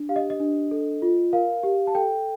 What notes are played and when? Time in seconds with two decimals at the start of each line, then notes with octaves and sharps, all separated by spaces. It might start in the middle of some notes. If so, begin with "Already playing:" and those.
Already playing: D4
0.09 G4 F5
0.16 D#5
0.30 D#5
0.40 D4
0.71 A4
1.02 F4
1.33 A#4 F5
1.63 G4
1.87 A5
1.95 A4 G5